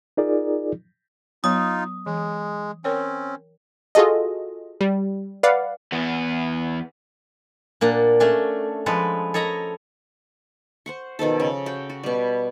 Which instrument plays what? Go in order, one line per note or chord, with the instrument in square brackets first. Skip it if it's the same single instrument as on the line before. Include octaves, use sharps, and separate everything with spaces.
[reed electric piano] D#4 F4 G#4 A#4 D5
[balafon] F#3 B3 C#5 [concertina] D#4 F4 [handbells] D#6
[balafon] E3 [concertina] G#3
[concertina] C4 C#4 [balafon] A#4 C#5 G5
[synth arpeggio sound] F4 F#4 G#4 A4 D#5
G3
B4 D5 F5 F#5
[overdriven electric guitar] E2 B3
[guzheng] A#2 A#3 D4 F#5
A3 C#4 D4
F3 G#3 A4 B4
A4 C#5 D#5 A#5 B5
[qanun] C5 F#5 C#6
B2 D#3 F3 A4
C#3
F#4 G5
F#4
B2 G3